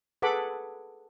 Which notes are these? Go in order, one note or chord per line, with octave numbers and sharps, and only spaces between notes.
G#4 A4 B4 F#5 B5 D6